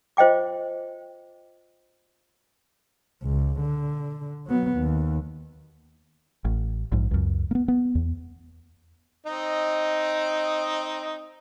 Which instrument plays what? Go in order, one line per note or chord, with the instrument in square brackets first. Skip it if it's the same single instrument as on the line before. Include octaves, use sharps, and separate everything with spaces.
[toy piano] F4 C5 D#5 G5 D6
[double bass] C#2
D3
F#3 B3
D#2
[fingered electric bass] A1
A#1 G#2
C#2 F#2
A#3 B3
B3
E2
[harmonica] C4 D#4 D#5